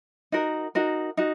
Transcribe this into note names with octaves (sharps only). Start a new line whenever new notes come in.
D#4 F#4 A#4
D#4 F#4 A#4
D#4 F#4